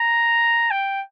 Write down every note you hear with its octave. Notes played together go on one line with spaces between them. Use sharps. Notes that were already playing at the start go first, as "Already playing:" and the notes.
Already playing: A#5
G5